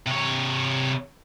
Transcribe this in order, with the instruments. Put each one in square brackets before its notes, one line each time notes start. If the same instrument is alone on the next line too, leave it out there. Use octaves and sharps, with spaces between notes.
[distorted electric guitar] C3 C#5